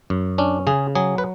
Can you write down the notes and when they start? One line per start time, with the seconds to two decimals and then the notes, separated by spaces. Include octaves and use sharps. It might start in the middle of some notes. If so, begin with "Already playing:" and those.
0.10 F#2
0.38 C#4 D4
0.67 C#3 G#4
0.95 F#3 G#4
1.18 B4